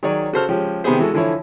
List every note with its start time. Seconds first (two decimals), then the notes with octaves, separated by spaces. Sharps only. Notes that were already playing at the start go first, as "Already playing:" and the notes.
0.03 D#3 F#3 G#4 C#5 D5
0.33 C#3 F#4 A4 C5 A5 F6
0.49 F3 G#3 C#4 G4
0.84 C3 D#3 B3 G4 G#4 C5
0.99 E3 G#3 F#4 A4
1.14 D3 E3 F3 E4 C#5